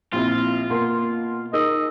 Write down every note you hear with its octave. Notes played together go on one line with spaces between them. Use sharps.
A#1 C4 E4 F4
B2 A#3 C6
D#4 G#4 A#4 D#5 E6